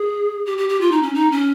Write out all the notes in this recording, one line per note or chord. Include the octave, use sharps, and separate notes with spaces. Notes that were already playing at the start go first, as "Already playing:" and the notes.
Already playing: G#4
G4
G4
G4
F4
D#4
C#4
D#4
C#4